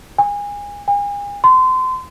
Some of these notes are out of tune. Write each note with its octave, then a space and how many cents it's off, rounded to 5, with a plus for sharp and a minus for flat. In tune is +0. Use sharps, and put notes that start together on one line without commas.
G#5 -25
G#5 -40
C6 -30